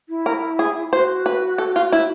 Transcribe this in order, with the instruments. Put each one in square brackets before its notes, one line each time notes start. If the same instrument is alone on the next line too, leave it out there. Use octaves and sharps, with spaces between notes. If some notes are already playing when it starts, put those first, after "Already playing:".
[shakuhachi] E4
[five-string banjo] A#4
G#4
[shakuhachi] F#4 [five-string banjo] C5
[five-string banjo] B4
A4
F4
E4